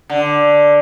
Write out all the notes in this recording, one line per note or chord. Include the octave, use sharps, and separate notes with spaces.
D3